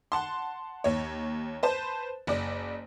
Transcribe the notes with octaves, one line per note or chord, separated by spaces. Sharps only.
F#5 A5 C6
D#2 C#5
B4 C5 A5
F#1 D5